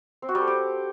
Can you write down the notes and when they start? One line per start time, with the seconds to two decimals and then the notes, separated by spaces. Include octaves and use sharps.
0.22 C4
0.29 F#4
0.35 G3
0.41 A4
0.47 G4